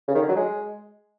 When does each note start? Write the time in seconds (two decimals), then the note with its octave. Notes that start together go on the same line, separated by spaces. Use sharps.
0.08 C#3
0.15 D#3
0.22 D3
0.29 F#3
0.36 G#3